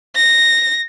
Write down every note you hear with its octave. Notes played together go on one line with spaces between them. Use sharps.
A#6